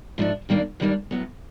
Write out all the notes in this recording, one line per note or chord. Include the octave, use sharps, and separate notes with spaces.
G#2 F3 A3 D4
G2 D#3 G3 A#3 D4
G2 D#3 G3 A#3 D4
A2 F#3 B3